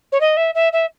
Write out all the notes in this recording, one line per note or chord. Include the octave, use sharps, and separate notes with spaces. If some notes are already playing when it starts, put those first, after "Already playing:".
C#5
D#5
E5
E5
E5